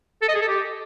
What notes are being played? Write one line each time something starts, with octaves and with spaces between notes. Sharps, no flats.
A4
D#5
G#4
A4
G4